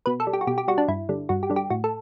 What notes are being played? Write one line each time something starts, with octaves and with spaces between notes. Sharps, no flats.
B2 B4
A4
G3
G4
F#4
B2 G4
G4
G3 F#4
D4
G2 E4
D3 G3
G2 F#4
G4
D3 G3
G4
A2 F#4
A4